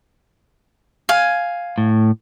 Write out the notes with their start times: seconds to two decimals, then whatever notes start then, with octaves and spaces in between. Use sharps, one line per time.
1.09 F5 G#5
1.78 A2